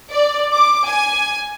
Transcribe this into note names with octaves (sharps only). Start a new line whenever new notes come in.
D5
D6
G#5